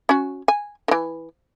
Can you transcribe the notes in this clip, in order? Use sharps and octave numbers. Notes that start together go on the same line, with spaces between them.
C#4 F#4
G#5
D#3 E3